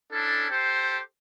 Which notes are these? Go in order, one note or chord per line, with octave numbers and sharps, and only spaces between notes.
C#4 D4 E4 A4
G4 A4 C5